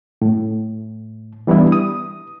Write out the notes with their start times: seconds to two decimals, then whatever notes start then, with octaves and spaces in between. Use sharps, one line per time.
0.22 A2
1.47 E3 G3 B3 D4 E4
1.72 D#6